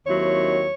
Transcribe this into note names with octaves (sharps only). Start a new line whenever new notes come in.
D#2 D#3 F#3 C4 E4 C#5